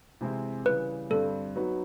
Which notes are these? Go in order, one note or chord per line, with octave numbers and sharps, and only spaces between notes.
C3 E3 G#3 C4 E4
C#3 E3 G3 B4
G2 D3 G3 C4 A4
F#3 B3 D#4 F#4 B4